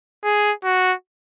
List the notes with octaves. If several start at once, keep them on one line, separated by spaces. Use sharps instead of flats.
G#4
F#4